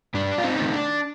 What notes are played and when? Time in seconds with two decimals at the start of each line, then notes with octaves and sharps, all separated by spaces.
0.14 G2 D4
0.38 F4
0.44 C4 D#4
0.59 D#3 A3 C4
0.74 D4